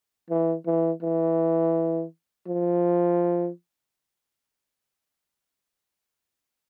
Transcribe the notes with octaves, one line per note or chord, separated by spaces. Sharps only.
E3
E3
E3
F3